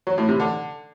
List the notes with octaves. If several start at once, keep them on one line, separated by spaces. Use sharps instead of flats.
F#3
A2
C3
D3